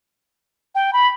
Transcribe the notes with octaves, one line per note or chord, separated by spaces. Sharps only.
G5
B5